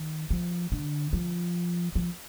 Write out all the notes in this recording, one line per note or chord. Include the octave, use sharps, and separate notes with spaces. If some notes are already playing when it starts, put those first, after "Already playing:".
Already playing: D#3
F3
D3
F3
F3